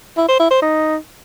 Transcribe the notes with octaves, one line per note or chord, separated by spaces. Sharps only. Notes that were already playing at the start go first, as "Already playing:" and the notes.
E4
C5
E4
C5
D#4